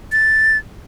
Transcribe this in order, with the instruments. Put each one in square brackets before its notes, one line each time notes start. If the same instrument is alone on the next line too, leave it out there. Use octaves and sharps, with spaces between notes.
[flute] A6